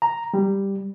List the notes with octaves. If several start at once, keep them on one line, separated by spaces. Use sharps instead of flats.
A#5
G3